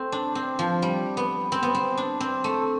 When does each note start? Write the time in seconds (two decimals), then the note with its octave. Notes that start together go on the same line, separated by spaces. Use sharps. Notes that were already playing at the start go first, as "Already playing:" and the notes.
Already playing: A3 C4
0.12 D4
0.35 C4
0.59 F3
0.82 G3
1.17 B3
1.52 C4
1.63 B3
1.75 C4
1.97 D4
2.20 C4
2.44 A3